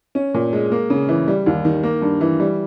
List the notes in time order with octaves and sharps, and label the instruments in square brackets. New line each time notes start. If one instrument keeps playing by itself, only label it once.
[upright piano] C#4
A#2
G#3
A#3
C#3
E3
G3
D#2
D#3
A#3
G2
E3
G3